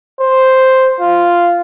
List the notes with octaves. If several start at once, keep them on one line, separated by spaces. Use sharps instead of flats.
C5
F4